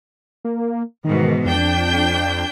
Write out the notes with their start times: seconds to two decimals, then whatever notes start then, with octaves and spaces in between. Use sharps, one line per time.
0.45 A#3
1.04 G#2 B2 D#3 E3
1.45 F2 D4 G5 G6